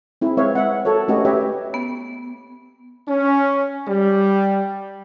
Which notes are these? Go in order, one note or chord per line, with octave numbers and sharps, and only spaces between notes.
C4 E4 G#4
G#3 C4 B4 C#5 E5 F5
E5 F#5
F#4 A4 A#4 C#5
A3 C#4 F#4 G4 B4 D#5
G4 B4 C#5 E5
B3
C#4
G3